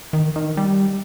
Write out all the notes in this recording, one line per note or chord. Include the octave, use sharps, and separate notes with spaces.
D#3
D#3
G3